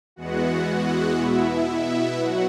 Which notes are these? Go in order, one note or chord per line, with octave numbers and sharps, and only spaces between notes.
E2 E3 G#3 B3 F#4 F#5
F#4 F#5
B2 B3 E4 E5
B2 F#3 F#4 F#5